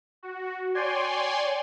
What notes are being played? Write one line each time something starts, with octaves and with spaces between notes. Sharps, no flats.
F#4
C#5 D5 G5 G#5 C6